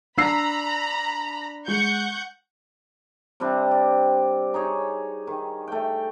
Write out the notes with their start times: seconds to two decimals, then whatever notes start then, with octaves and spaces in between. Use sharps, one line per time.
0.18 D4 A#5 B5 E6 C7
1.68 G#3 F#5 C#6 G6
3.40 C3 G3 C4 D4
3.71 D5
4.54 D#4 G#4 C#5
5.27 D#3
5.68 A3 G5